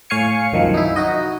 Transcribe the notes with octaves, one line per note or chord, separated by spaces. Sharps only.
A2 C#5 F5 G#5 C#7
C2 F#2 D#3 F3
D#4 E4
D#4 F#4 D#5